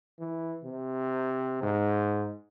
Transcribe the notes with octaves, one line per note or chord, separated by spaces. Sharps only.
E3
C3
G#2